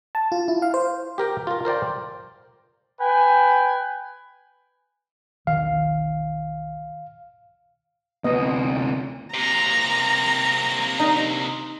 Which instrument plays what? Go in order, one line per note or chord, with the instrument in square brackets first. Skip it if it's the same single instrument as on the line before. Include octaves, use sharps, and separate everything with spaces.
[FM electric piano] A5
F4
E4
F5
C5
[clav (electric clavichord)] G4 A#4 G5
F4 A#4
A#4 C5 D5 G5
[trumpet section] B4 G5 G#5
[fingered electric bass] B1 E2 D#3 [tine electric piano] F5
[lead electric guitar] D2 C3 [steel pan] B3 D#5
[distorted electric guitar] C3 A#3 [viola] A#5
[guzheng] D#4